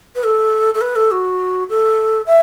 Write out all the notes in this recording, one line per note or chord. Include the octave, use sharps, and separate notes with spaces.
B4
A4
A4
B4
A4
F#4
A4
E5